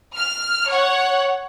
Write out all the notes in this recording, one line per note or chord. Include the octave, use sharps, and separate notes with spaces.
F6
C#5 F#5